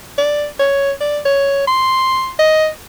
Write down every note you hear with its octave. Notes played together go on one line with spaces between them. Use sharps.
D5
C#5
D5
C#5
C6
D#5